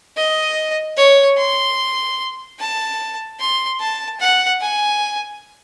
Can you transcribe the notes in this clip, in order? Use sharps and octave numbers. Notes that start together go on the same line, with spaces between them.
D#5
C#5
C6
A5
C6
A5
F#5
G#5